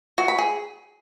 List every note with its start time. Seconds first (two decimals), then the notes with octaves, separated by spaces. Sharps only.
0.18 F#4
0.28 B5
0.38 G#4